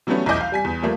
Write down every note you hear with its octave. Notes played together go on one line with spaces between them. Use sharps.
E3 F#3 G3 A3 B3 C#4
B1 E2 E4 D#5 D6 G6
F5
G3 G#5 B6
E2
F3 G3 A3 A#3